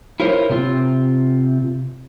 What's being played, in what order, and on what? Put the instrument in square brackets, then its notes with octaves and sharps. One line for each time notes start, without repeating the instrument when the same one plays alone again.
[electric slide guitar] E4 F4 A#4 C5 C#5
C3 C4 F4